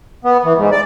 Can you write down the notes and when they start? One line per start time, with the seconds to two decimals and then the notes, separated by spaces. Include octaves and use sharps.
0.25 B3
0.45 E3
0.58 G#2
0.72 D5